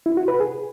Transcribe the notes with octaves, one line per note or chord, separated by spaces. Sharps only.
E4
F#4
B4
G#4